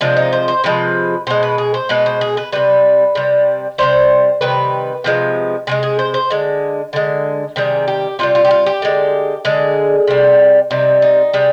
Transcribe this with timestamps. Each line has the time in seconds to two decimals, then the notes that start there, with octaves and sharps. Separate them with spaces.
0.01 C3 F3 G#3 D4
0.17 D#4
0.32 C5
0.48 C5
0.64 C3 F3 G#3 B4
1.27 B2 G#3 C5
1.43 B4
1.58 G#4
1.74 C5
1.89 B2 G#3 B4
2.06 C5
2.21 G#4
2.37 B4
2.52 C3 G3 B4
3.15 C3 G3
3.78 C3 D#3 G3 C5
4.41 C3 D#3 G3 B4
5.04 C3 F3 G#3
5.67 C3 F3 G#3 G#4
5.83 G#4
5.99 C5
6.14 C5
6.30 D3 G#3
6.93 D3 G#3
7.56 C3 D#3 G3 G#4
7.88 G4
8.19 C3 D#3 G3 F4
8.35 F4
8.45 G4
8.51 F4
8.66 G4
8.82 D3 G#3
9.45 D3 G#3 G#4
10.07 C3 G3
10.71 C3 G3 D#4
11.02 D#4
11.33 C3 G3 G#4